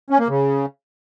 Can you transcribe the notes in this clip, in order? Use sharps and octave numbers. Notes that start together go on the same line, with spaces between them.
C#4
A#3
C#3